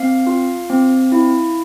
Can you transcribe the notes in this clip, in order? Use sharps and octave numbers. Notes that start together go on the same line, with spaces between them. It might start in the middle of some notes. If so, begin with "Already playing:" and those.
Already playing: C4 F5
F4
C4
E4